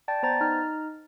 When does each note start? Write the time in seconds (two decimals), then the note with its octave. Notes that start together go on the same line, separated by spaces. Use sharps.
0.08 D5 G5 A5 A6
0.23 B3 C5 A#5 A6
0.41 D#4 A#5 F6